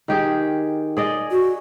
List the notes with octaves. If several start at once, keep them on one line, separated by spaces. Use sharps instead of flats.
D#3 G4 G#4
G#4 D5 D#5
F#4